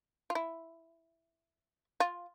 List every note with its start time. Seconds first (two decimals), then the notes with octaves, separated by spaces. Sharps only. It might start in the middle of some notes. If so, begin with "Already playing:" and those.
0.30 F4
0.35 E4
2.00 F4